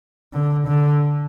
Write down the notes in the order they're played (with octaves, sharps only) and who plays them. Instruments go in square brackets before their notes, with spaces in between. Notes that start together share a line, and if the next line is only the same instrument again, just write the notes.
[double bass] D3
D3